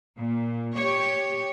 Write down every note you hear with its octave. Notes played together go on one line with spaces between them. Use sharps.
A#2
G4 C#5